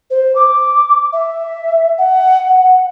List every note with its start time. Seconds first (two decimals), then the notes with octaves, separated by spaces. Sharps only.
0.10 C5
0.36 D6
1.13 E5
1.98 F#5
2.48 F#5